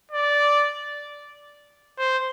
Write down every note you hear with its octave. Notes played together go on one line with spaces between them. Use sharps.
D5
C5